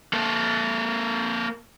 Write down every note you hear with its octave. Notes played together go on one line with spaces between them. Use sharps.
A#3 A4